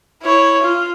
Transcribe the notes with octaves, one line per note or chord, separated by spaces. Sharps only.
E4 C#5
F4